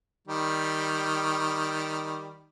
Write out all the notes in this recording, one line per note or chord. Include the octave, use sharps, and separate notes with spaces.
D#3 G3